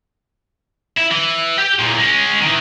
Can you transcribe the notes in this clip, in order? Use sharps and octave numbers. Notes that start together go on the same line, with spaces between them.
E4
E3
G4 G5
E2 A#2
G#3 C#4
D#3 E3